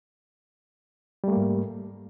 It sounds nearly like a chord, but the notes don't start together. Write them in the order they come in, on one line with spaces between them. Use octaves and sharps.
G3 A3 A#3 G#2